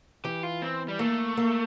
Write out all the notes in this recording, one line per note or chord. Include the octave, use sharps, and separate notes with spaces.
E3 G4
F4
C4
G3
A3 A#3
A#3